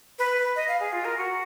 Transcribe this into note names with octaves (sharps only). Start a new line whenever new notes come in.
B4
D#5
F5
G#4
F4
A#4
F#4